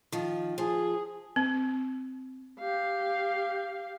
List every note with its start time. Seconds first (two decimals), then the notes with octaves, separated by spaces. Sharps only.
0.12 D#3 F3
0.58 F3 G#4
1.36 C4
2.60 G4 F5